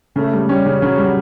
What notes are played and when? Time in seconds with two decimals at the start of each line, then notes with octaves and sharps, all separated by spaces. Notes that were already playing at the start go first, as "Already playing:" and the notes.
0.16 C#3 A3
0.33 G3
0.49 G3 C#4
0.66 C#3
0.82 C#3 F#3
0.98 G3